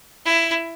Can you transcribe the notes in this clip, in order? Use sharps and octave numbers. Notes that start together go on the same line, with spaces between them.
E4